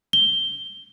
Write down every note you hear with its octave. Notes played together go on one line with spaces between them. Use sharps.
G7